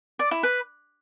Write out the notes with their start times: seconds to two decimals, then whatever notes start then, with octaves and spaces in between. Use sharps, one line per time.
0.19 D5
0.31 E4
0.43 B4